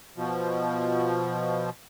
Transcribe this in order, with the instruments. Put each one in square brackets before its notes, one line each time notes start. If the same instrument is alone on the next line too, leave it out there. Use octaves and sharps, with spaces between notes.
[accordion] B2 F3